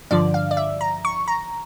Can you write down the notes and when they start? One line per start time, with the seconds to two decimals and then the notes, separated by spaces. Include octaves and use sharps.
0.11 G2 D3 F3 D5
0.34 F5
0.51 D5
0.57 E5
0.81 A#5
1.05 C#6
1.28 A#5